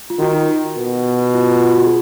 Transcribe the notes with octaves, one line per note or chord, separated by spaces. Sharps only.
F4
D#3 F#4
B2
F4
F4
F4
F#4
G#4